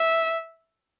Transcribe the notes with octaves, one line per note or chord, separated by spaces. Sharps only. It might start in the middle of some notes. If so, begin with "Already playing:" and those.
Already playing: E5